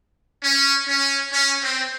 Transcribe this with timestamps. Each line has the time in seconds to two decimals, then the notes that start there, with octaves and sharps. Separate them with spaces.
0.42 C#4
0.87 C#4
1.32 C#4
1.62 C4